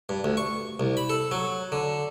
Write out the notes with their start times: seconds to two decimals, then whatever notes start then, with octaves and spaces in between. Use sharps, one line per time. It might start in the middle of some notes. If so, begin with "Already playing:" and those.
0.09 G2
0.24 D2
0.37 C#6
0.80 C2
0.97 B5
1.10 A4
1.31 F#3
1.72 D3